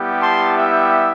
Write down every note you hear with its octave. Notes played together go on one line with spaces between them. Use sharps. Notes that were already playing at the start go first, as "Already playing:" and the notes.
Already playing: G3 B3 E4 G4
A5 C6
E5 G5